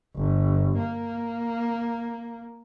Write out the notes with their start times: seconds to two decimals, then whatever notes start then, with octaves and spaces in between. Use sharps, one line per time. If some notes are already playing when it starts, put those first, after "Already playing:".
0.17 G1
0.79 A#3